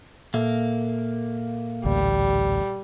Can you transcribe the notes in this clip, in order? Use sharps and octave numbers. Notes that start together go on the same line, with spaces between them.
A#2 A#3 A4 E5
A1 D2 G3